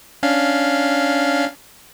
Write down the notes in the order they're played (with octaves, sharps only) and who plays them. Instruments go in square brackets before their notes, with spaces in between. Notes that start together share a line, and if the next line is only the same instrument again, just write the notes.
[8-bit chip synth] C#4 D4 F5